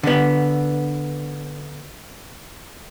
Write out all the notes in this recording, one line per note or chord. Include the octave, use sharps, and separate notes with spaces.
D3 B3